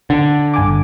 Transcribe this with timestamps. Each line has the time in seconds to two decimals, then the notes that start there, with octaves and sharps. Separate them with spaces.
0.10 D3
0.54 G1 G#5 D6